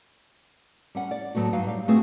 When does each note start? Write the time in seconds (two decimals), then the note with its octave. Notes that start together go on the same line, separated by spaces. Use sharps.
0.95 G3 C#4 F#5
1.11 D5
1.35 A2 F#3 A3 B3 F#4
1.53 G2 F#3 D#4 F5
1.67 G3 F5
1.88 A3 B3 C4 F#4 G#4